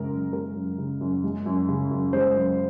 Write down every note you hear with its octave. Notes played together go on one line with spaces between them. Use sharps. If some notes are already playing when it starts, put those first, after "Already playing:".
Already playing: F#2 C#3 G#3 A#4
F#2
G#3 A#4
F#2
C#3
F#2
G#3
F#2
C#3
F#2
G#3 C5
F#2